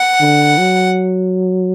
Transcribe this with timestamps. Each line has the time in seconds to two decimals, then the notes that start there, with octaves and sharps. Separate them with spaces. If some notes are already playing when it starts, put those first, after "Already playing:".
Already playing: F#5
0.21 D3
0.58 F#3